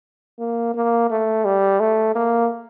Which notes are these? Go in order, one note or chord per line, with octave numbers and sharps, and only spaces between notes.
A#3
A#3
A3
G3
A3
A#3